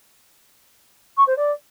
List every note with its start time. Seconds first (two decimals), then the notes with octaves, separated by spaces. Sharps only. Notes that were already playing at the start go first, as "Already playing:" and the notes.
1.17 C#6
1.27 C5
1.37 D5